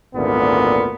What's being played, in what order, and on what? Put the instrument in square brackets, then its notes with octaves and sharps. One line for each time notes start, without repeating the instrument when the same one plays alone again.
[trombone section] G#1 D2 A#2 B3